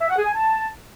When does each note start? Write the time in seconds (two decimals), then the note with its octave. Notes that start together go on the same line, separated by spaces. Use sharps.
0.01 E5
0.09 F#5
0.17 G#4
0.26 G#5
0.34 A5